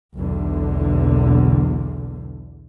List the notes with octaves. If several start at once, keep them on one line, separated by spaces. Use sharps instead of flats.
B1 E2 D3